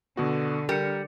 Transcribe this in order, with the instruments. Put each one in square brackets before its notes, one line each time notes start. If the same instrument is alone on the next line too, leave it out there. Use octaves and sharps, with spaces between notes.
[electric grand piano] B2 B3 F#4 [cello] D3
[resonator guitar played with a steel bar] G3 [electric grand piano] A#4 C#7